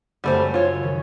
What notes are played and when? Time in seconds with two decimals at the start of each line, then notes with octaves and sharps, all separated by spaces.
0.24 F#2 C#3 G3 A3 C5
0.54 F4 C#5
0.83 D#3 C#4